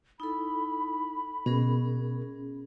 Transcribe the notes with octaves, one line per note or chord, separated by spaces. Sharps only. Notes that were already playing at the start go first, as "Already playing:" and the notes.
D#4 E4 A4 B5
B2 C#4 G#4 A#4